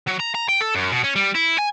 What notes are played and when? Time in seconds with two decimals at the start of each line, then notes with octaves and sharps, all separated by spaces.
0.08 F#3
0.20 A#5
0.35 A#5
0.49 G5
0.61 A4
0.75 F#2
0.92 B2
1.04 C#4
1.16 G3
1.35 E4
1.59 G#5